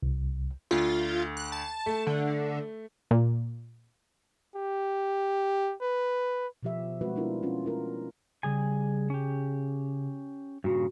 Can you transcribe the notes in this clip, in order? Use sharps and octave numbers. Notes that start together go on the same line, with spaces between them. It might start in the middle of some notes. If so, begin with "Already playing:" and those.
C2
D2 F4
F#6
A5
A3
D3
A#2
G4
B4
B2 D#3 F3 G4 E5
G3 G#3 C4 F#4 B4
B3 D4 E4 F4 A#4
C#4 F4
G#3 A3 F4 A#4
C#3 G3 G#4 G#5
C#4 G4
G2 A#2 C#3 F#4